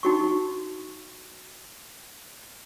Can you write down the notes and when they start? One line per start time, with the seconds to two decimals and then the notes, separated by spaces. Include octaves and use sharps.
0.03 D#4 F#4 C#6